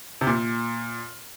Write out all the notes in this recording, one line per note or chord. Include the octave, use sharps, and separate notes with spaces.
C3
A#2